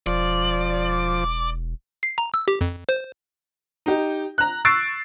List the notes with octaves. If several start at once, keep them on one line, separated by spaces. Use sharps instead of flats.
E1 F3 D5
C7
A#5
E6
G4
F2
C5
D#4 G4
A#5 F#6
C#6 E6 A6 C7 D7